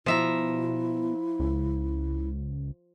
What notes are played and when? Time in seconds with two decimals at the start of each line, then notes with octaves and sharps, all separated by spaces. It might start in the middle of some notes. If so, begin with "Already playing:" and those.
0.06 B2 F3 E4 E5 A#5
1.40 C#2